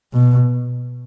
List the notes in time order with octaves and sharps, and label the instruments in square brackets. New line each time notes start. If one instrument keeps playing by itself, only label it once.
[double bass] B2